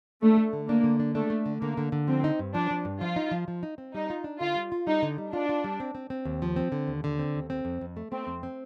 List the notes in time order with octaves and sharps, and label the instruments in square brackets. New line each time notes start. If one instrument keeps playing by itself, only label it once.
[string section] A3 [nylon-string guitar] D4
[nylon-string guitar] A3
D3
[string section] A#3 [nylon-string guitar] D4
[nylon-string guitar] D3
D4
[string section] A3 [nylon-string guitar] D4
[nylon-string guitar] A3
D3
[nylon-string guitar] D3 [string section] A#3
[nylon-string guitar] D3
D3
[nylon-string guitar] F3 [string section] C4
[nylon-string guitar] D#4
G2
[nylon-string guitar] F3 [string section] D4
[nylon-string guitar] F3
G2
[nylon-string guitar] F3 [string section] F4
[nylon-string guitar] D#4
F3
F3
D#4
C4
[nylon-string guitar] G3 [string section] D#4
[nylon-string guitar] F4
D4
[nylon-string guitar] D3 [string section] F4
[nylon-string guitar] G3
F4
[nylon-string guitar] G3 [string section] D#4
[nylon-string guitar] D3
G3
[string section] D4 [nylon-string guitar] F4
[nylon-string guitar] F4
G3
C4
C4
C4
D#2
F3
C4
D3
D#2
D3
C4
D#2
C4
F2
F2
A3
[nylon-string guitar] A3 [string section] C4
[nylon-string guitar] F2
C4